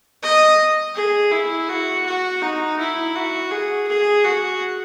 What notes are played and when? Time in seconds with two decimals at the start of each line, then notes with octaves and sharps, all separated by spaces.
0.23 D#5
0.95 G#4
1.32 E4
1.69 F#4
2.05 F#4
2.42 D#4
2.79 E4
3.15 F#4
3.51 G#4
3.88 G#4
4.24 F#4